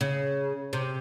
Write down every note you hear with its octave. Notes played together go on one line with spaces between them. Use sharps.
C#3
C3